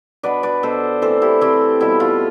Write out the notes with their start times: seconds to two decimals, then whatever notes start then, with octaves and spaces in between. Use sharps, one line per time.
0.23 B2 B3 D4 B4 D5
0.43 B4 D5
0.63 B2 B3 D4 A4 C5
1.02 E3 A3 C4 A4 C5
1.22 E4 G4
1.41 E3 A3 C4 E4 G4
1.80 B2 G3 B3 E4
2.00 F4